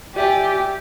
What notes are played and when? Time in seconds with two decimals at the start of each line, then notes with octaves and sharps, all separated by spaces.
0.16 G4 D5 E5 G#5